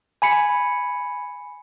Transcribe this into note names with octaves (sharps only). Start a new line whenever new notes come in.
G#5 B5 C#7